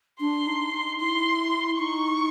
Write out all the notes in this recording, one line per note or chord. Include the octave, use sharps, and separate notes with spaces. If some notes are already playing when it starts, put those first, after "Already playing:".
D4 C6
D#4
D#4
E4 C6
D#4 C#6